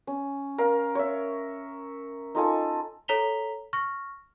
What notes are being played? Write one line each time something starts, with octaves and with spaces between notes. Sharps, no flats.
C#4
A#4 F5
C#5 E5
D#4 F4 A4 G#5
A4 C#5 A#5 B6 F7 G7
C#6 F6 A#6